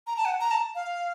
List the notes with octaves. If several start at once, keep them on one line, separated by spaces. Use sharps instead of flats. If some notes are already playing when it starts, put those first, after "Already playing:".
A#5
A5
F#5
A#5
A5
F5